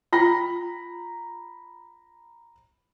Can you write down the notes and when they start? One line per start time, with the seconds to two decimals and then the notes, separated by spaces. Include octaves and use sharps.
0.13 F4 G5 A#5 B5 A#6